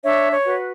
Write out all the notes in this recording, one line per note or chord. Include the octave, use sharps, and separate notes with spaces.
D4 C#5 E5
C#5
F#4 B4